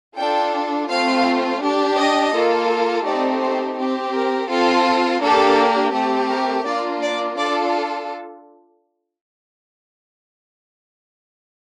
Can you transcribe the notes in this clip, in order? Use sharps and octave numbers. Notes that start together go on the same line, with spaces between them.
D4 F4 A4 G5
A3 C4 F4 F5
D4 G4
D#5
A#3 F4 A4
A3 C4 D#4 G4 D5
C5
C4 G4
A#4
C4 F4 A4
A#3 D4 G4 A4
A3 C4 G4
A#4
A#3 D4 F4 D5
D5
D4 F4 A4 D5